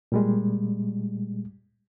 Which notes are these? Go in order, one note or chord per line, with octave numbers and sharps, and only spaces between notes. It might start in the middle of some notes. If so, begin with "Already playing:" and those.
A#2 G3 G#3